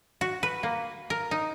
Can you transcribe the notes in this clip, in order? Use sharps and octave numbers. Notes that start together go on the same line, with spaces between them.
F#4
B4
A#3
A#4
D#4